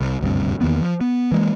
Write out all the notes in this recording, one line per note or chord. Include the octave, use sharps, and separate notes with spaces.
C2
F#1 D2 G2 C3
E2 D#3 A#3 B3
F3
B3
E3 G#3 A#3